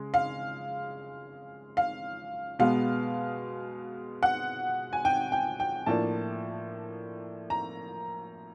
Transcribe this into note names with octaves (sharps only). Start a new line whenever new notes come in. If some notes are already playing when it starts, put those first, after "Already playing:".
Already playing: C#3 G#3
F5
F5
B2 G#3 B3 F5
F#5
G#5
G5
G5
G5
A2 F3 A#3 D4 A5
A#5